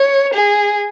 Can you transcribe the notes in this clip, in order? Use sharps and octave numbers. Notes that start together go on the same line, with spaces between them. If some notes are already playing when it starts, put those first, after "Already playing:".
Already playing: C#5
G#4